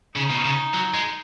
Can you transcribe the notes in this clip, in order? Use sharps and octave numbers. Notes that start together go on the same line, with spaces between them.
C#3 D#4
B2
C#3
F#3
G#3